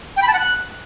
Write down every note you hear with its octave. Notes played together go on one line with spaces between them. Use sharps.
G5
B5
A5
F#5
F#6